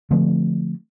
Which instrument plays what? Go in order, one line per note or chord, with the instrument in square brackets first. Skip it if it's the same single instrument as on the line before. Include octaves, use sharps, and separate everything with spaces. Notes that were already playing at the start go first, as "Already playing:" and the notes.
[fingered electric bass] D3 F3 A3 C4